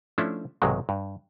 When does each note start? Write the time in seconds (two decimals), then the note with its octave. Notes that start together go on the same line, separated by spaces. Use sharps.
0.18 F3 A3 C#4 D4 E4 E5
0.62 B1 G#2 C3 D#3 F#3 G#3
0.89 G2